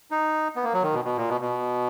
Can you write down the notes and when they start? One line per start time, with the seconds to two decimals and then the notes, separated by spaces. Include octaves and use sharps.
0.11 D#4
0.56 B3
0.64 A#3
0.74 F#3
0.82 D#3
0.93 B2
1.05 B2
1.17 A#2
1.29 B2
1.41 B2